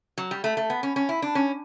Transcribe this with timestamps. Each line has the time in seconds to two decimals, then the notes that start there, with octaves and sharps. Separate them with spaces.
0.18 F#3
0.31 G3
0.44 A3
0.57 A3
0.70 B3
0.83 C#4
0.96 C#4
1.09 E4
1.22 D4
1.35 C#4